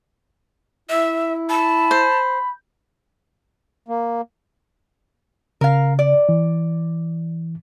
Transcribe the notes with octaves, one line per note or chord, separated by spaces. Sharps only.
E4 E5
A5 B5
C5
A#3
C#3 A#4 F5
D5
E3